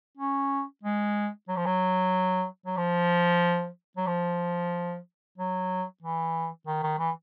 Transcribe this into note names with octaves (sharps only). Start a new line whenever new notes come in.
C#4
G#3
F#3
F3
F#3
F#3
F3
F#3
F3
F#3
E3
D#3
D#3
E3